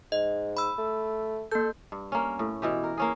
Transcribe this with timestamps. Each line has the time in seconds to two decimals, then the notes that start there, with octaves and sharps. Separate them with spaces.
0.12 G#2 D#5
0.57 B5 E6
0.78 A3
1.52 A#3 A4 G6
1.92 G2
2.12 A#3 C#4
2.39 A2
2.62 B2 E3 G4
2.84 A#4
2.97 A#3 C#4 G#4